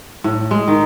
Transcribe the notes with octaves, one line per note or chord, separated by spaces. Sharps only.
A2
G#3
D#3